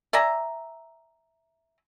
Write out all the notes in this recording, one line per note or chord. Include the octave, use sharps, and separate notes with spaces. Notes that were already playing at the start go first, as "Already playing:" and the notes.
D5 E5 G#5 A#5